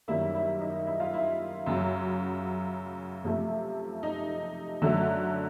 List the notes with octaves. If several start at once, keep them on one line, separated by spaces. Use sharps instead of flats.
F#2 D#3 G3 A#3 E4
E4
D#4
E4
F4
E4
F#2 C#3 F#3
C3 F3 A3
D#4
F#2 D3 F#3 A3